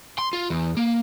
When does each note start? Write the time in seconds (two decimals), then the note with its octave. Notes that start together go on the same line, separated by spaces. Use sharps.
0.18 C6
0.33 F4
0.50 E2
0.77 A#3